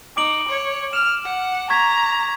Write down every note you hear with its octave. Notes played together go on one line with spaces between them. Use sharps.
D#4 D6 D7 F#7
C#5
F6 E7
F#5
A#5 C#6 G#6 B6